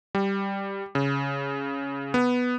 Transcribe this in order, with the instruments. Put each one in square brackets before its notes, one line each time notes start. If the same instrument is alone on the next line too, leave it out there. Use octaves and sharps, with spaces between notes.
[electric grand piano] G3
C#3
B3